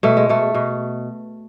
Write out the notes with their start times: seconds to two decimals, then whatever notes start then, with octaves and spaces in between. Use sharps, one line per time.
0.03 B2 A3
0.17 G#3
0.29 B2 A3
0.55 B2